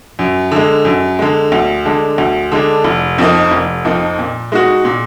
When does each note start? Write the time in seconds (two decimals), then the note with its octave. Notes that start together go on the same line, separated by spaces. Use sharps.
0.19 F#2
0.51 D3 G#3
0.85 F#2
1.19 D3 G#3
1.52 D2
1.85 D3 G#3 D4
2.18 D2
2.52 D3 G#3 D4
2.84 F1
3.18 F2 F3 A#3 D#4
3.51 F1
3.85 F2 F3 A#3 D#4
4.19 A#2
4.52 G#3 D#4 F#4
4.85 A#2